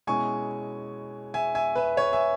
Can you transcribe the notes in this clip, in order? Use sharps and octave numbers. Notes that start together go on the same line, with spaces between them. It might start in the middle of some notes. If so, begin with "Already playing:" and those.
B2 G#3 C#4 E4 G#5 C#6
E5 G#5
E5 G#5
B4 E5
C#5
E5 G#5